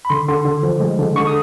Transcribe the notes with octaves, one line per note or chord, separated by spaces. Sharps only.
B5
D3 C6
D3 C6
D3
F3
G#3
D3
D3 C#6
D#6